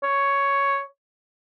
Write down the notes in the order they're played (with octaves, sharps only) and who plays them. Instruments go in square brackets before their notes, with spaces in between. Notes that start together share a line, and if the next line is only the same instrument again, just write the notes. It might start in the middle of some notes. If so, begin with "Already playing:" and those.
[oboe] C#5